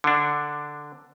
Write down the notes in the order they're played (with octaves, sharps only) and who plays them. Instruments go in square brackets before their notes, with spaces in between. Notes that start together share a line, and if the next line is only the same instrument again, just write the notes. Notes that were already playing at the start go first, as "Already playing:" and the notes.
[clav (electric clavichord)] D3 D4